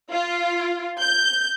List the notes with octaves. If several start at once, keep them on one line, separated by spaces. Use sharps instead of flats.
F4
G6